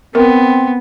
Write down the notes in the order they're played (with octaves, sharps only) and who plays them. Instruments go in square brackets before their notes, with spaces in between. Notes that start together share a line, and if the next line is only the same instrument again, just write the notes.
[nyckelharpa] B3 [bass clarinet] C4 [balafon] A#4